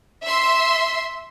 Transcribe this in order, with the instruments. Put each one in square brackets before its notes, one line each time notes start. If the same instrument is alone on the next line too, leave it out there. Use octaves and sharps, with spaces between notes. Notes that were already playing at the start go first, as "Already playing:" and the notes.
[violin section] E5 C6